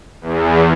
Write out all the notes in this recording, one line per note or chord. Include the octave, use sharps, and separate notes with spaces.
E2